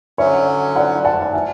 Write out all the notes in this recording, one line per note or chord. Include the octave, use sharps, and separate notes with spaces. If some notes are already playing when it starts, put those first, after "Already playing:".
D3 F#3 C#4 C#5 E5
D5 F#5
F#5 A5
F#5
E5 G#5